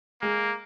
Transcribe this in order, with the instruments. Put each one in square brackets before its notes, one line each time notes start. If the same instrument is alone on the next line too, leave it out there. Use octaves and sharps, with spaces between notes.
[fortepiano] G#3 [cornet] A#3